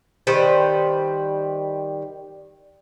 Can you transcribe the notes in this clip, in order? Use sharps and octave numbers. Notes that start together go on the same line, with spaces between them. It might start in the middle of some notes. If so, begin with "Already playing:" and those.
D#3 G3 B4 C5